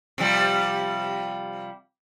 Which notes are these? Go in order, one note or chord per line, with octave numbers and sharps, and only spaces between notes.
C3 F3 G3